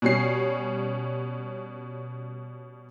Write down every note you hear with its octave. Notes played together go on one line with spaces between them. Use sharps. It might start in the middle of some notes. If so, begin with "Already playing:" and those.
B2 G3 C#4 C7